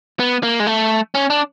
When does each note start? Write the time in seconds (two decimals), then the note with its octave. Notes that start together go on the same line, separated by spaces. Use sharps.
0.20 B3
0.43 A#3
0.60 G#3
0.67 A3
1.15 C#4
1.30 D4